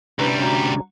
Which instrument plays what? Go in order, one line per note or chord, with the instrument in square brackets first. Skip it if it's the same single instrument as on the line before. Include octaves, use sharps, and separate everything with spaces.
[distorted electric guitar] D2 G3 [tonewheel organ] C3 C#4 D4 [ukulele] E4 A#4 B4
[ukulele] F#4 C#5 A#5